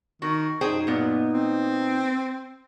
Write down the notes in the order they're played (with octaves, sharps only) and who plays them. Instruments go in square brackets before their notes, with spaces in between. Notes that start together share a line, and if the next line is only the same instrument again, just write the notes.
[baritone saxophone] D#3 [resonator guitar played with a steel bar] F#4
[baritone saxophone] F#2 [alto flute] D#4 [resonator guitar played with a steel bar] G#4 C5 G5
[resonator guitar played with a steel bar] A#2 B3
[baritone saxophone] C4